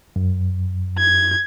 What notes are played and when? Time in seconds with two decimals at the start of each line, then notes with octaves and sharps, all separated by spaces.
0.16 F#2
0.98 G#6